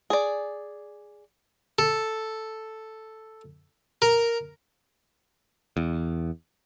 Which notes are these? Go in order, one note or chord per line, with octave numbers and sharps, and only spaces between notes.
G#4 D5
A4
A#4
E2